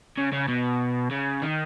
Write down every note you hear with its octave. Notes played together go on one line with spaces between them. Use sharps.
C#3
C#3
B2
C#3
D#3